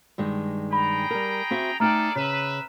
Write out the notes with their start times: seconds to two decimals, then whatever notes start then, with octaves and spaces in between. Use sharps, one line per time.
0.18 G2 D#3 G#3
0.73 G#4 G5 A#5 B5
1.11 G3 A#4
1.51 C4 F#4 E5
1.80 A3 D#4 G#4 A4 D5 G5 A#5 F6
2.16 C#3 B4 E5